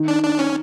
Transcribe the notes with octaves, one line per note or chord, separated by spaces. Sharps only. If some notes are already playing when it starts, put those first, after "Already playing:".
Already playing: D#3
D4
D4
C#4